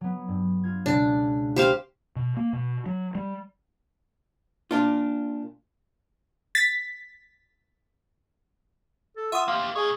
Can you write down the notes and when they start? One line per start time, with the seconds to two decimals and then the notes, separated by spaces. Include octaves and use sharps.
0.01 F#3 B3
0.28 G2
0.63 F4 G#6
0.86 C#2 B2 D4
1.14 F#6
1.56 A#3 B3 G4 C5 F5
2.16 B2
2.37 A#3
2.53 B2
2.86 F#3
3.15 G3
4.71 A#2 D4 F4
6.55 A6 B6
9.17 A4
9.32 F4 E5 F#5 C#6 D#6 D#7
9.48 A#3 G4 F5 C6 D6
9.76 A#2 G#4 C#5 D#5 G#5 C#6